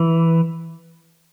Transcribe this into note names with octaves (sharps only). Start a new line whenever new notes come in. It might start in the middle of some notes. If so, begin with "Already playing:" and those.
Already playing: E3